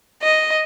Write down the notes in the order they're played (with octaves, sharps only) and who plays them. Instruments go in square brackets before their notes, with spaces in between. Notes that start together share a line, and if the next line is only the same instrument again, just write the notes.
[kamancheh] D#5